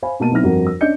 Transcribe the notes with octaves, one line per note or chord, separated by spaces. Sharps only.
C5 F5 G#5 B5
B2 A#3 A5 D#7
B1 B3 C4 E4 F6 A#6
G1 F2 F#4 A#4
E6
C#4 D4 D#5 G6 C#7